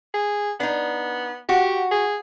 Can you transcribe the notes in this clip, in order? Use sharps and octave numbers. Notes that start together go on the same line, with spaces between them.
G#4
B3 D4 D#4
F#4 G4
G#4